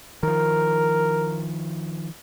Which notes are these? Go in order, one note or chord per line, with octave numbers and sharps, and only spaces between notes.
D#3 F3 A#4